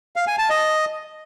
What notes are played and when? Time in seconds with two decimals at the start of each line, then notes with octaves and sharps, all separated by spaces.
0.16 F5
0.27 G#5
0.39 A5
0.50 D#5